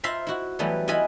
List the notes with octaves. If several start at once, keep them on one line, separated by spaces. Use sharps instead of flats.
F4 C5 E5 F5 A#5 B5
E4 F#4
E3 F#3 G3 A3 B3
E4 F4 D#5 F#5 G#5 B5